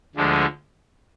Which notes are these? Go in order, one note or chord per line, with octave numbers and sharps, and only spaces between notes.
D2 D3 F3 G#3